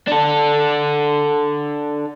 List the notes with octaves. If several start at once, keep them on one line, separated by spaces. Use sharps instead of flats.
D4 A4